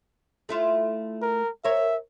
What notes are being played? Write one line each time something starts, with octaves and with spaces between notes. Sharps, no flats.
A3 E4 F4
A#4
A#4 C#5 E5